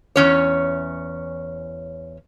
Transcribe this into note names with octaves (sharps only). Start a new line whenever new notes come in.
E2 C#4 C#5